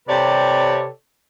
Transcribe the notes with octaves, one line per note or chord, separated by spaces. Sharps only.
C3 G4 A4 B4 C#5 D5